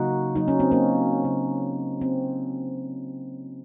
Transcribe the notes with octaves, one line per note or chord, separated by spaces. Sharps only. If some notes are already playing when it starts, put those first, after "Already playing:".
Already playing: C#3 F#3 A#3 D#4 F#4
C#3 F#3 A#3 D#4
C#4
C4
A#3 C#4
C#3 F#3 A#3
C4